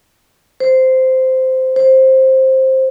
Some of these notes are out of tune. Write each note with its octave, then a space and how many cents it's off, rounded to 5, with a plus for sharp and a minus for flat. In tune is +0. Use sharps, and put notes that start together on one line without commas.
C5 -10
C5 +10